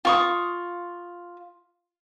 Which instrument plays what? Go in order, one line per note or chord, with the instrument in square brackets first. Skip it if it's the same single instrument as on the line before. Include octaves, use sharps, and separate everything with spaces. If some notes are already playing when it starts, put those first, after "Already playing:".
[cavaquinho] F4 C#6 D#6